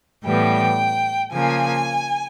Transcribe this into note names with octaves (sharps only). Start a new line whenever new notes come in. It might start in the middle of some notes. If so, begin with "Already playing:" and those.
A2 E3 G3 B3 G5
C#3 F3 A#3 G#5